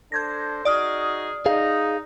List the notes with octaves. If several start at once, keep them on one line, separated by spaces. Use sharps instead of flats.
D4 A4 C5 G6 G#6 A#6
D#4 F#4 G#4 D5 D#6 F6
D#4 G#4 F5